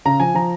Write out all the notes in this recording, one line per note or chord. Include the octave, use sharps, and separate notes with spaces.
C#3 A#5
F3 G#5
F3 A#5